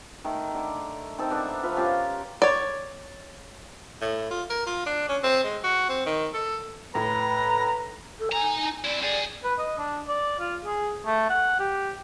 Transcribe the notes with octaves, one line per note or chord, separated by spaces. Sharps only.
D#3 A3
D3
D#3 C4 D#4 A4
B3 D4 E5
F3 B4 E5 F5
C#4 F4 G4 A#4
C#5 D5
A2
F4
A#4
F4
D4
C#4
C4
G#3
F#4
C4
D#3
A4
A2 B4 A#5
A4
D#4 G#5 A#5
C4 E4 D5
G3 G#4 D5
B4
D#5
D4
D5
F4
G#4
A3
F#5
G4